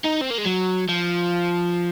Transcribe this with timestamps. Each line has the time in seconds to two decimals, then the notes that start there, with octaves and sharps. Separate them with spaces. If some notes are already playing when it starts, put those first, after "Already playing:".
0.04 D#4
0.21 C4
0.30 A#3
0.38 G#3
0.45 F#3
0.89 F3